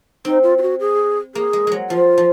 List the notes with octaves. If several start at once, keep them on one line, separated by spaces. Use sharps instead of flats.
C4 D#4
F4
F4
F#4
G#4
A#3 G#4
G#3
F#3 G#3
F3 F4
F3